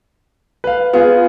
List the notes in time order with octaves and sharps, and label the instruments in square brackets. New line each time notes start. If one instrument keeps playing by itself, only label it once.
[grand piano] B4 F5
[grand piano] B3 G#4 [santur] F4